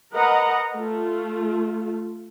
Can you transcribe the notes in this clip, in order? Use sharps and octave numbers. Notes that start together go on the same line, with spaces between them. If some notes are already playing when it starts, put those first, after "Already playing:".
A#4 B4 D#5 F#5 A#5
A3 F4